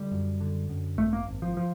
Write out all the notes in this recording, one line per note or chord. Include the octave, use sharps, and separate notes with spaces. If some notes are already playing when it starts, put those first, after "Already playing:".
Already playing: D3 G3
F#2
D3
F#2
G#1 A3
A#3
G#1
F3
F3